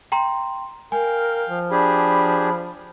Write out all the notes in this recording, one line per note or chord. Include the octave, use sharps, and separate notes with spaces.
G5 A#5 C6
A#4 F5 G5 G#5
F3
D4 G4 G#4 B5